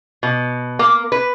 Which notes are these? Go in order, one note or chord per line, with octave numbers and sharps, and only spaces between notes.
B2
A#3
B4